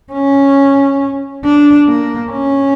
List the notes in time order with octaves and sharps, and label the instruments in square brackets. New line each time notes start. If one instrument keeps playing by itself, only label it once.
[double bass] C#4
D4
A#3
C#4